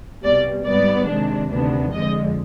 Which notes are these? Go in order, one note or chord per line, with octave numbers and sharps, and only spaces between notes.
C2 B2 G3 D5
G#2 G3 B3 D5
C3 D#3 G#3 D4
D2 C3 D#3 B3 D4
F2 D3 F3 G#3 D#5